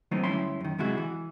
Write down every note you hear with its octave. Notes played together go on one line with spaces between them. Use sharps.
D#3 E3 F#3 A3 C4 D#4
D2 G2 C#4 E4 B5 C6
F#2 D#3
C3 G#3 E4 F#4
E3